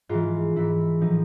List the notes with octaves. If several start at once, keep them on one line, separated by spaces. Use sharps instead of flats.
G#2 E3 F4
G#2 E3 E4
A2 F3 D#4